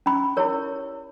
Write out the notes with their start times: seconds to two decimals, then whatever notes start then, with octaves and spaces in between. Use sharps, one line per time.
0.06 C#4 B5
0.37 E4 G4 A#4 C#5